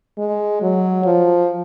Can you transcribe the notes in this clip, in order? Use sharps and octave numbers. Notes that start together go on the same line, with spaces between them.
G#3
F#3
F3